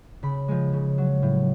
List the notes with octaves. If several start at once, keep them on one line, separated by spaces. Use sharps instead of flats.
C#3 B5
F3 G#3
C#3
F#3
A2